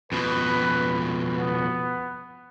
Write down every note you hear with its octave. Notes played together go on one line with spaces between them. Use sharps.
F2 B2 B4
B3